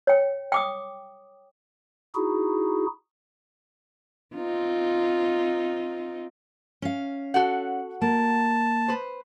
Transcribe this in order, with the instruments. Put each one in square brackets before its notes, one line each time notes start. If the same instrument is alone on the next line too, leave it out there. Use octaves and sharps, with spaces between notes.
[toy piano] C#5 G5
G5 D6 D#6
[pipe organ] D#4 E4 F#4 G#4
[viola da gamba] C4 D#4 F4
[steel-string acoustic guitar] C#4 F5
[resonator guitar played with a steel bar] F#4 A4 F#5
[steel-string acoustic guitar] A#3 [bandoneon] A5
[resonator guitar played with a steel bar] B4 C5